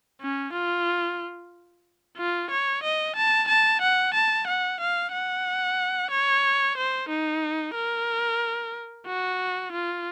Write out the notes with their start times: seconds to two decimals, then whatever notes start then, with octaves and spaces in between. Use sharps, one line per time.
0.21 C#4
0.53 F4
2.17 F4
2.51 C#5
2.84 D#5
3.16 A5
3.49 A5
3.82 F#5
4.14 A5
4.47 F#5
4.80 F5
5.12 F#5
6.11 C#5
6.77 C5
7.09 D#4
7.75 A#4
9.07 F#4
9.72 F4